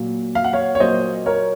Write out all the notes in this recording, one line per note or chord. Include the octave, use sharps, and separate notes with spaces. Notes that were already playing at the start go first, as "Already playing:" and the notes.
Already playing: A#2 F#3 A#3
F5
F#5
C#5 F5
C#5
A#2 F#3 A#3 C5 D#5
A#4 C#5